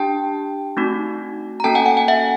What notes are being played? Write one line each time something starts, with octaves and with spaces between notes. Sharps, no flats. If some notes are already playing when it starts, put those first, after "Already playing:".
Already playing: D4 G4 G5 A5
A3 C4 D#4 F#4
A#5
A#3 C#4 F#4 A4 G5 A5
F#5 G#5
F#5 G#5
F#5 G#5
E5 F#5